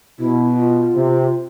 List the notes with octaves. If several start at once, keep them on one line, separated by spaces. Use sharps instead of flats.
B2 E4
F4
C3